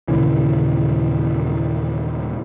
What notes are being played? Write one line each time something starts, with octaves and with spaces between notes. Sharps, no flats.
D#2 A#2 C#3 E3